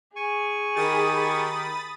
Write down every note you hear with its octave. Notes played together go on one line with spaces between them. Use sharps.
G#4 G#5 C#6
D#3 G4 B5 D#6 A6